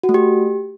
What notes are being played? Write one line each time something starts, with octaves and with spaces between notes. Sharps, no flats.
F#4
A3
G4